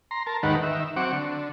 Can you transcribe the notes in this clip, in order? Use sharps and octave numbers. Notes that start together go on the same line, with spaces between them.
A#5 C6
A#4 A5
D#2 G#2 D#3 B4 F#5
D#3 E5
F#3 C4 F#5 C#6 D6
D3